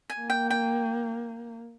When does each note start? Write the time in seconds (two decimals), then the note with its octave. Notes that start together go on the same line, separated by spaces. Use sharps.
0.10 G#5
0.20 A#3
0.30 G5
0.50 G5